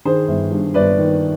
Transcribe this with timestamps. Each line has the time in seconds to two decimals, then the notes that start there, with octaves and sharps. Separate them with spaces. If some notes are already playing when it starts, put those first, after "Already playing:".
0.05 D#3 G#4 C5
0.28 G1
0.52 G2
0.74 G1 B4 D5
0.98 D#3